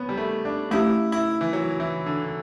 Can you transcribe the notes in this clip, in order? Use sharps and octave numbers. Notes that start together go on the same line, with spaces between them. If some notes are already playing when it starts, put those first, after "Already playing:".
Already playing: B3 C#4
G3
A3
D4
A3 C#4 E4 G4
E4
E3
F#3
E3
D3